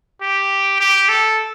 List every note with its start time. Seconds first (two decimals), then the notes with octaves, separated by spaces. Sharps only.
0.22 G4
0.80 G4
1.09 A4